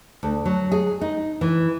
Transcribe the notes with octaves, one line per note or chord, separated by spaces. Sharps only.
D2
F#3
G#4
D#4
E3